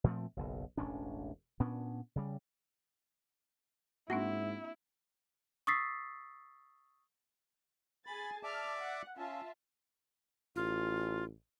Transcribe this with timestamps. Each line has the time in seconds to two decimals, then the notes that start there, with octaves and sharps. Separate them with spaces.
0.04 A#2 F3 A3 C4
0.37 F#1 B1
0.77 E1 A1 C#4 D4
1.60 A#2 B3 C#4 D4
2.16 C#3 G3
4.10 G#2 A#3 C4 D4 E4 F#4
5.67 C#6 D#6 E6 A6 B6 C7
8.07 G#4 G#5 B5 A6
8.43 D5 E5 A5 D6 F6
8.79 F#5
9.17 C#4 F4 E5 A5
10.56 A1 F4